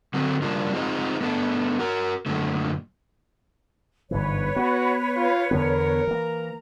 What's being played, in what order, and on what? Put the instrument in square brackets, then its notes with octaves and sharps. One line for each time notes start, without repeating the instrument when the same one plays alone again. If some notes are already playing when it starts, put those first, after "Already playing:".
[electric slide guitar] D3 F#3 C4 A4
C#3 F3 G3 A#3 D4
F3 G#3 C4 D#4
A3 B3 D4 A4
F#4 A#4
F#2 A#2 D3 A3
[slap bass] G1 G#2 E3 [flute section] B4 C#5
[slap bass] B3 [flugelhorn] F#4
[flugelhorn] F4
[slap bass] E2 D3 B3 [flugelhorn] A#4
[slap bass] E3 A#3 [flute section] A#5